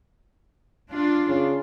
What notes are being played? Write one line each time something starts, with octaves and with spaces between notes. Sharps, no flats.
D4 F4
C#3